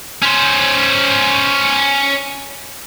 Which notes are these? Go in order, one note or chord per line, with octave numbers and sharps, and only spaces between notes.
C#4 C5